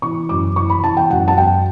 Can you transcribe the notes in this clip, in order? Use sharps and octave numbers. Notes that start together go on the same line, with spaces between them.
E3 C#6
F#2 D6
E3 C#6
B5
E3 A5
G5
F#2 F#5
A5
F#2 G5